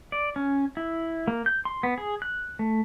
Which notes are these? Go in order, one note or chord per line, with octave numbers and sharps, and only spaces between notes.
D5
C#4
E4
A#3
G6
C6
B3
G#4
F#6
A3